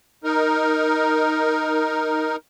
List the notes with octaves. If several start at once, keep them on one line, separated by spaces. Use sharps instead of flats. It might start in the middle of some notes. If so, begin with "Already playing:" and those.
D#4 A#4